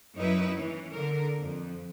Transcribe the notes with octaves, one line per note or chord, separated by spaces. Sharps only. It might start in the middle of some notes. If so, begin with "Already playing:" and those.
F#2 C#4 D#4 E4 B4
E3 C#4
D3 A#4
F2